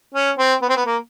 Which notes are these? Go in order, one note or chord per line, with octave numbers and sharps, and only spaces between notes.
C#4
C4
B3
C4
B3
A#3